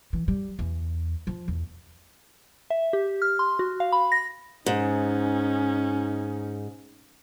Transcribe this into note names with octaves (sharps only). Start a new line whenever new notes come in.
E3
G3
E2
F3
E2
E5
G4
F6
C6
F#4
F5
B5
A#6
G#2 C#4 D#4